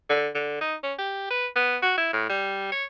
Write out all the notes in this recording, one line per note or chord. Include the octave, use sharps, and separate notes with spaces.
D3
D3
D#4
C#4
G4
B4
B3
F#4
E4
A2
G3
C#5